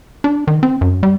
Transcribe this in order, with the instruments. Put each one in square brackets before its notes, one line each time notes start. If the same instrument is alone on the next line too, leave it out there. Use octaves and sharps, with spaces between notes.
[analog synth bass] D4
D#3
C4
F#2
G3